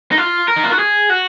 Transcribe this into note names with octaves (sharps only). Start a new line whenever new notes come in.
D#4
F4
A#4
D#4
F4
F#4
G#4
F#4